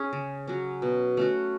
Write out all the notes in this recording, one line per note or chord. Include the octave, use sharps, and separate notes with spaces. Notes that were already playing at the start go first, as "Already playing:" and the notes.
Already playing: C#4 G#4
C#3
F#3 C#4
B2
A3 C#4 F#4